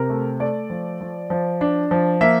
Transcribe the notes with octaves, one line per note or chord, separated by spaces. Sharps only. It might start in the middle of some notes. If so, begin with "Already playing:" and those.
Already playing: C3 A#4
A3
A3 D5
F3
F3
F3
D4
F3
A#3 E5